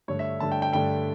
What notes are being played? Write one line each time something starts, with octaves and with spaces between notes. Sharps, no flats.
G2 D3 A3 C#5
E5
G2 D3 A3 A5
G5
G5
G2 D3 A3 G5